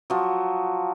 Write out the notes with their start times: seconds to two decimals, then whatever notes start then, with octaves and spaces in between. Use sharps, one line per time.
0.10 F3 F#3